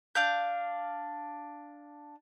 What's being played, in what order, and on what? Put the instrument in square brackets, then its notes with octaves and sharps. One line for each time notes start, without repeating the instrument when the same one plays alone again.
[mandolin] D4 F5 G6